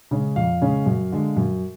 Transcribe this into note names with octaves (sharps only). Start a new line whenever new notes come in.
C#3 G#3 C#4
F2 F5
C#3 G#3 C#4
F#2
D3 G#3
F#2